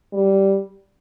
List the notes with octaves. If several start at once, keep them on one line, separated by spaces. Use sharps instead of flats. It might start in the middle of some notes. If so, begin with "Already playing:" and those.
G3